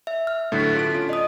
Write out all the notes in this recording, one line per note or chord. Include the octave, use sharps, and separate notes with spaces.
E5
F6
A2 D3 F#3 B3 E4 F#4
F4 A4 D7
C#4 F4
D5 D#5 D#6